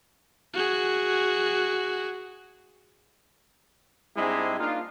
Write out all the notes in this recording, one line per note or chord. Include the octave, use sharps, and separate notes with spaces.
F#4 G#4
G#2 G3 G#3 C4 D4 E4
A#3 D4 D#4 F4